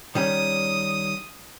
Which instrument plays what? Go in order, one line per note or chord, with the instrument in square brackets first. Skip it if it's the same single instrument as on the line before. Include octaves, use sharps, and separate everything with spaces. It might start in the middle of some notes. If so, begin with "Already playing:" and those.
[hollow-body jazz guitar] D#3 G3 C#4 [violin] D#6